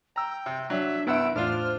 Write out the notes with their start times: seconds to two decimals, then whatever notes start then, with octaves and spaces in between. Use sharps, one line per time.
0.16 G5 A#5 E6
0.46 C3
0.70 F#3 D4 E5
1.07 C2 G2 B3 E5 F#5 E6 D7
1.36 E2 A2 D4 F4 C5 F6